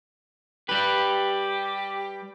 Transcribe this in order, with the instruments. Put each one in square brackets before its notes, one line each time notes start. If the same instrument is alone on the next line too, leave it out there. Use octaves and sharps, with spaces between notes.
[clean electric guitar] G3 B4 [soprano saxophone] G4